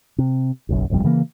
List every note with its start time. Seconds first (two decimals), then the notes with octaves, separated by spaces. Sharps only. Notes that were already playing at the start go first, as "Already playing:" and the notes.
0.18 C3
0.69 F#1 B1 F#2
0.90 G1 C2 F2 G3
1.04 C#3 E3 G3 A#3